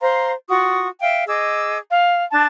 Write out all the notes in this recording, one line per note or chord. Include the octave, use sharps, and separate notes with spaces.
C5 F5 A#5 C6
F4 F#4 C#6 D#6
E5 F5 G5
G#4 D#5 D6 E6
F5
D4 A5